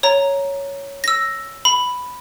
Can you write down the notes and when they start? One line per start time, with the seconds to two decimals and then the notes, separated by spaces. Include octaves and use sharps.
0.03 C#5 A#5
1.04 E6 A#6
1.65 B5